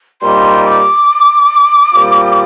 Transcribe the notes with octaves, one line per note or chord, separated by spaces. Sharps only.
A#2 G3 C4 D#4 C6
D6
A#2 G3 C4 F4